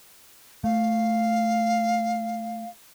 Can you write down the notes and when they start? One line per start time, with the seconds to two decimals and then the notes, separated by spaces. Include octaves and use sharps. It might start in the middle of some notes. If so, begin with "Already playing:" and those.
0.64 A3 F5